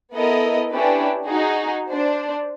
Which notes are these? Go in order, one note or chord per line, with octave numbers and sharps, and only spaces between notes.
B3 E4 A4 A#4 D#5
C#4 D4 E4 G4 B4
D#4 F#4 G#4
D4 C5